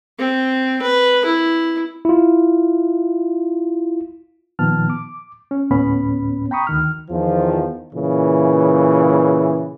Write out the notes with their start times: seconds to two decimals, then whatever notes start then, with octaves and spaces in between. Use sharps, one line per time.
0.19 C4
0.82 B4
1.25 E4
2.05 E4 F4
4.59 A#2 D#3 F3 B3 A5 F6
4.90 D6
5.51 C#4
5.70 D2 A2 B3 C#4 B5
6.51 G5 A#5 B5 C#6 D#6
6.67 D2 D#3 F6
7.10 E2 D#3 F3
7.93 A#2 C#3 E3